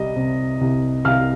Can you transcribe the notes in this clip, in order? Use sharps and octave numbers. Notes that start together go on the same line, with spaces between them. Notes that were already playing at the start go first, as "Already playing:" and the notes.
Already playing: C2 G3 D#5
C3
C2
C2 F5 F6